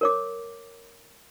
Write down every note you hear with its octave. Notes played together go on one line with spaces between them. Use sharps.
A#4 C#5 D6